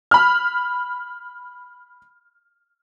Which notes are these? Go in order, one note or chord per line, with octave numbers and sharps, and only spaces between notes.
B5 F6